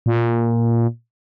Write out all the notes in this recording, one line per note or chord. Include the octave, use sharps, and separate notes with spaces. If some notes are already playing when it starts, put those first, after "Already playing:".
A#2